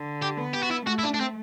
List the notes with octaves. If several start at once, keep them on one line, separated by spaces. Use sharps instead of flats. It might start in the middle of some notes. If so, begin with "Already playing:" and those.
Already playing: D3
G4
B3
G4
F#4
E4
A3 F#4
E4
D4
D4
C4